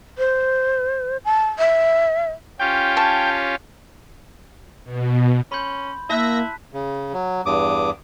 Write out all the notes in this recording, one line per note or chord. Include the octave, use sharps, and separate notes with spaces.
C5
A5
E5
C#4 F4 G4 G5
C#5 A5 C#6
B2
C#4 B5 C6 G6
A#3 E4 E5 A5 F#6 A#6 B6
C#3
F#3
E2 G2 D6 D#6